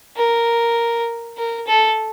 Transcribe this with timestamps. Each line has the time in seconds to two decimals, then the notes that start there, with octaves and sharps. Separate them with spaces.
0.17 A#4
1.38 A#4
1.67 A4